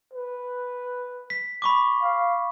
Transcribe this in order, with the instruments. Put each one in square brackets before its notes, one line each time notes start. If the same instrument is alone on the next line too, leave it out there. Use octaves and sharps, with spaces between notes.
[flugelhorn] B4
[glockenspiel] B6
B5 C#6 D6
[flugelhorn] F5